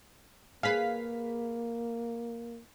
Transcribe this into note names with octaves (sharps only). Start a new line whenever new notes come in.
A#3 G#4 B4 F5 B6